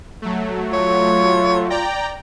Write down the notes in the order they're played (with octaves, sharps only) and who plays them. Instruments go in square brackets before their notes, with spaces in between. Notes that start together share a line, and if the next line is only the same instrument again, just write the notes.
[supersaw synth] F#3 A3
[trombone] F4 [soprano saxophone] C#5
[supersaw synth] D5 G5 A#5